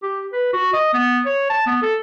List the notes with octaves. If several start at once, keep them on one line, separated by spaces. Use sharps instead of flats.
G4
B4
F#4
D#5
B3
C#5
A5
B3
A4